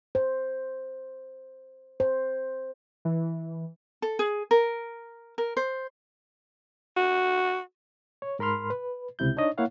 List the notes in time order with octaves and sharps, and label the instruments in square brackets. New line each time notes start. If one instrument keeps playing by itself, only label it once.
[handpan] C5
C5
[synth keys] E3
[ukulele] A4
G#4
A#4
A#4
C5
[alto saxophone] F#4
[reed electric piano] C#5
G#2 A#4 B5 C6 F6
B4
C#2 C3 E4 G6
D4 D#4 C#5 D#5
A#3 E4 C#5 F5 F#5